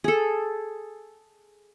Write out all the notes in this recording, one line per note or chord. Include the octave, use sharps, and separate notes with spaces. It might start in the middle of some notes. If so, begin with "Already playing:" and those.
G#4 A4